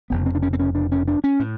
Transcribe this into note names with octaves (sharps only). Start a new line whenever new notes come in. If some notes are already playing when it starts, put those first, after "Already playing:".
F1 F2 C#3 B3
C4
D4
C#4
C4
C#4
D4
C#4
D4
C#4
A2